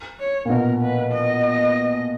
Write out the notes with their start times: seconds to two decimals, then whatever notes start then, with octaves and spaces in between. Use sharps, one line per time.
0.20 C#5
0.45 A#2
0.50 B2 A#4
0.81 B4
1.12 D#5